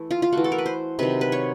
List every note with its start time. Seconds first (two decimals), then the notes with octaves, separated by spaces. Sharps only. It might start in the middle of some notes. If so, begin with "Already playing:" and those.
Already playing: E3 A3
0.11 F4
0.22 F4
0.32 E3 A3 F#4
0.44 A4
0.52 A#4
0.58 B4
0.66 C5
0.99 C3 D#3 F#3 B4
1.21 B4
1.32 C#5